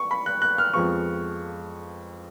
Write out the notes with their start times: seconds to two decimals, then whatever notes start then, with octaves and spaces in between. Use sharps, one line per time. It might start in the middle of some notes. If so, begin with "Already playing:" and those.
Already playing: C#6
0.11 B5
0.26 F#6
0.42 F#6
0.58 F6
0.74 F2 F3 G#3 B3 C#6